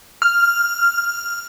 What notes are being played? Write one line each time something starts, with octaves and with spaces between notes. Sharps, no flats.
F6